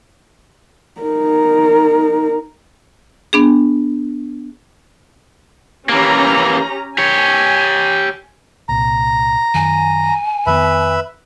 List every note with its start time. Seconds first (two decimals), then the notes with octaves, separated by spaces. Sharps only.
1.01 D#4 A#4
3.33 B3 D4 G#4
5.89 E3 A#3 C#4 G4 A#5
6.98 G4 C#5 G#5
8.69 C2 A#2 A#5
9.54 F#2 D#3 G#5
10.46 F2 D#3 B3 B4 E5 B5